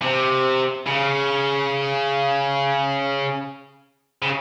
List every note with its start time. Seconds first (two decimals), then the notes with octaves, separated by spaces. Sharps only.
0.01 C3
0.87 C#3
4.22 C#3